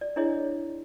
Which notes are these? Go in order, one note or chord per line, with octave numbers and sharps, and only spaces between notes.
D5
D4 E4 G#4 C#5 D#5